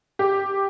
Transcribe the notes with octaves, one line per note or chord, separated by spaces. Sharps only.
G4